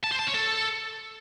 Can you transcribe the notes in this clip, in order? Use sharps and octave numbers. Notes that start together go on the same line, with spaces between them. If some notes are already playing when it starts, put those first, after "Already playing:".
A5
C5
A5
C#5
A4